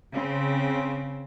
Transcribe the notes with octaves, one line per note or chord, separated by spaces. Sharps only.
C#3 C4